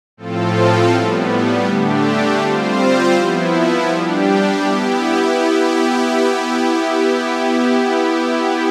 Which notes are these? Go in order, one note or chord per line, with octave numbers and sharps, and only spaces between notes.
A2 F3 C4 F4 A4
A2 G3 B3
D3 A3 D4 G4
G3 C4 F4 C5
F3 B3 E4
G3 D4 G4
B3 E4 G4